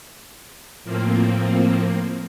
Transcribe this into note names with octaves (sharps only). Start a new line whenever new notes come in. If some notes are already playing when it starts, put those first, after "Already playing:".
A2 F3 A#3 C4